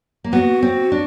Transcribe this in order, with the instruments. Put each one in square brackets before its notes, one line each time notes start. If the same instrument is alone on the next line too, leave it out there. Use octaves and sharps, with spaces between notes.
[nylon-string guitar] A#3
[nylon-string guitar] B3 [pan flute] F#4
[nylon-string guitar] C4
D4